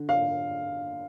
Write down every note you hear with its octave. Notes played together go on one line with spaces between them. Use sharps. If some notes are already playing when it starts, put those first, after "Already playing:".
Already playing: D3
F5